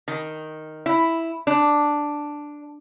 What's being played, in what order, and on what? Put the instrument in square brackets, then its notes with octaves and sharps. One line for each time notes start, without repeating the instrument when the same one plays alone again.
[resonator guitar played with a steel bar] D#3
E4
D4